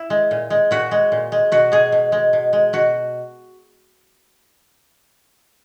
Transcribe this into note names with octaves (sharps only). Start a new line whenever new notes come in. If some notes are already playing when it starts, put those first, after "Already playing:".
Already playing: E4
G#3
A#2
G#3
A#2 F#4
G#3
A#2
G#3
B2 F#4
G#3 G#4
B2
G#3
B2
G#3
B2 F#4